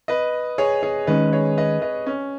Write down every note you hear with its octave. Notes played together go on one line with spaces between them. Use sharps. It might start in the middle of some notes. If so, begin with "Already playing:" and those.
B4 D#5
G#4 C#5
G#4 C#5
D#3 G#3 C#4 B4 D#5
G#4 C#5
B4 D#5
B4 D#5
C#4